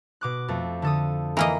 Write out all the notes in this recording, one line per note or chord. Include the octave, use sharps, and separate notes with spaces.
B2 D6 F#6
F2 A3
D3 A4 D#6
E3 A#3 D#5 A#5 B5